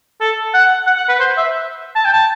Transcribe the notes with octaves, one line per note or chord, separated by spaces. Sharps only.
A4
F#5
F#5
F#5
B4
C5
E5
A5
G5
A5